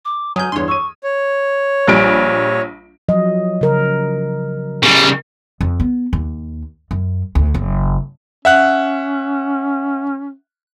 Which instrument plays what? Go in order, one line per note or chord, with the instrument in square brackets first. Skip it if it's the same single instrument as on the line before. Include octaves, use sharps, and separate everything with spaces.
[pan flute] D6
[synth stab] F#3 G6 [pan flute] G#5 [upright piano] D#6 F6 G#6
[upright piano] E2 G2 [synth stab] C#5 C6
[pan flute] C#6 [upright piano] E6 D#7
[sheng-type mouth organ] C#5
[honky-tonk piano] A#1 G3 D7
[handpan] F3 F#3 D#5
C#3 A#4
[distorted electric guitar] C#3 G3
[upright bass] F2
B3
D#2
F#2
D2
F#1
[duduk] C#4 [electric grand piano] E5 F#5 F#6